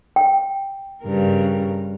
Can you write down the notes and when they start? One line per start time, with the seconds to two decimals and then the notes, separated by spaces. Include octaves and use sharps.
0.16 G5
1.04 G2 C#3 A#4